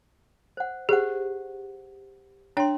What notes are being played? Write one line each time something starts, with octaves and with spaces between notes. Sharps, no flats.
C5 F#5
G4 G#4 C5 F#5
D4 C#5 G5 C6